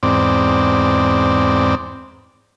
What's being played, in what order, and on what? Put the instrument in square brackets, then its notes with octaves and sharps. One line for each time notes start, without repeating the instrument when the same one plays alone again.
[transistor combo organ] E2 G#2 C4 D5